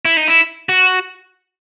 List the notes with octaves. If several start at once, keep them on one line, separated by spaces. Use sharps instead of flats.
E4
D#4
E4
F#4